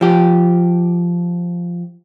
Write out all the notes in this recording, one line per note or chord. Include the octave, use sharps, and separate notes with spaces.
F3 G4